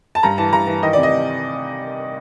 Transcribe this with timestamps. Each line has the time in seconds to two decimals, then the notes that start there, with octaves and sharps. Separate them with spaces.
0.15 A5
0.23 G2 A#5
0.38 E3 A5
0.53 G2 A#5
0.67 E3
0.82 D#3 D#5
0.93 C3 D5
1.03 D#5